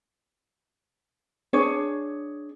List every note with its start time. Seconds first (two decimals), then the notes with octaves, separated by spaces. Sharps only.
1.53 D4 G#4 C#5